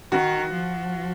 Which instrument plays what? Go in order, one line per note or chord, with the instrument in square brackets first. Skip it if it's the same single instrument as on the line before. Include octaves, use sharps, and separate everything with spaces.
[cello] D#3 [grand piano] F#4
[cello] F3